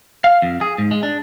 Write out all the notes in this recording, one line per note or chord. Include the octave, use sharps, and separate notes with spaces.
F5
F2
G#4
G#2
G#3
D4